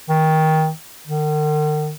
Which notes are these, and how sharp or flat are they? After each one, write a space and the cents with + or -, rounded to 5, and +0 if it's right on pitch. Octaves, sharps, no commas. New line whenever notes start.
D#3 +20
D#3 -45